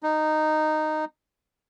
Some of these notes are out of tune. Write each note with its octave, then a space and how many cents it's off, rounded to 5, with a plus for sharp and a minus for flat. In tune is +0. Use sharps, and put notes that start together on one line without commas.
D#4 -10